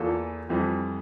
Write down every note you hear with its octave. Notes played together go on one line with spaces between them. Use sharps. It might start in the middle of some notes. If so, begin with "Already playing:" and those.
Already playing: E2 E3 A#3 F4 A4
F2 E3 G3 C4